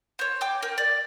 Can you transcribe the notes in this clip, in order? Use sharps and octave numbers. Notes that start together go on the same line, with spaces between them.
C5 C#5
G5 D6 G6
A#4
D5